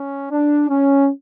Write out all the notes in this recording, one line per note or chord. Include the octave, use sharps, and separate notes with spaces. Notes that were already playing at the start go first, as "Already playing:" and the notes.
Already playing: C#4
D4
C#4